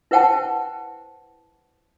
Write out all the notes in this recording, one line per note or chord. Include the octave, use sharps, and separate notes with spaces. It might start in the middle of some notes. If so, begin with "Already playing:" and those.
E4 B4 C5 F#5 G5 A5